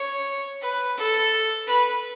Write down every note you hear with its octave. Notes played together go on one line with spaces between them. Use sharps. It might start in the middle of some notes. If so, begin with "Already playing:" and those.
Already playing: C#5
B4
A4
B4